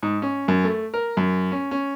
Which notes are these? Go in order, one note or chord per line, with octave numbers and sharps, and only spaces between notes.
G#2
C#4
F#2
A3
A#4
F#2
C#4
C#4